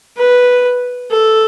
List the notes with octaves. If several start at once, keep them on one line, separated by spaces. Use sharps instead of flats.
B4
A4